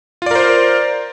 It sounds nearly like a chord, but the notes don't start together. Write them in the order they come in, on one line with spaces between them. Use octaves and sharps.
F4 D5 A#4 C5